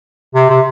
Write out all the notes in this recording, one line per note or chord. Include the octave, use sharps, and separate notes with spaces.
C3
C3